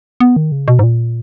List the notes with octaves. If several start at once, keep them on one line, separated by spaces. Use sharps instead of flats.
B3
D#3
C#3
B2
G#2
A#2